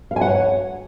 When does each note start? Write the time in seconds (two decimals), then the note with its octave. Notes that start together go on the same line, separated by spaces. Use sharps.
0.11 F5
0.16 G#5
0.21 F#5
0.27 C#5